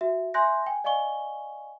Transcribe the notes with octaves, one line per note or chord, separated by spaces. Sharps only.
F#4 E5
E5 G#5 C6 F#6 G6 A#6
G5 G#5
D5 D#5 F5 G#5 C#6 G7